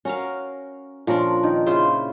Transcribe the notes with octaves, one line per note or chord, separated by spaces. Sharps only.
C#4 F#4 A#4 F5
A#2 F3 C#4 D4 A#4
D#3
C#3 E4 F4 C5